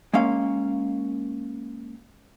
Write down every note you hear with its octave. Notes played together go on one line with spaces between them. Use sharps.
G#3 A#3 C#4 F5